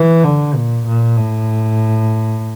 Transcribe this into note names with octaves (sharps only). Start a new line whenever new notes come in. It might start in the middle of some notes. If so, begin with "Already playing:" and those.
Already playing: E3
D3
A#2
A#2
A2